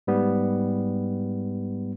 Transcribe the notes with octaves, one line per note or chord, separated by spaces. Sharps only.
G#2 G3 B3